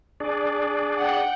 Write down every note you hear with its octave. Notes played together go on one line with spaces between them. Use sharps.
D4 G#4 D5
F#5 G5